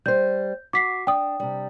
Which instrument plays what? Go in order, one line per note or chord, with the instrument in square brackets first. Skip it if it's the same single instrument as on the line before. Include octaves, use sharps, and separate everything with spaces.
[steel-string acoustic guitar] G3 C5 [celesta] G6
[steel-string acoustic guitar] F#4 [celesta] D6 B6 C7
[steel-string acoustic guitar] D4 [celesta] G5 D#6
[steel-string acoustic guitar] C3 G3